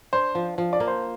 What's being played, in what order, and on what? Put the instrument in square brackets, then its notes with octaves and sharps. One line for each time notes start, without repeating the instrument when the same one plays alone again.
[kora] D4 [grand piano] C5
[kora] F3
F3
[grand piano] D5
[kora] A#3
[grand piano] C5